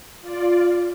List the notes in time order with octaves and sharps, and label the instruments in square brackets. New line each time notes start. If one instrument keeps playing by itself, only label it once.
[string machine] F4 D5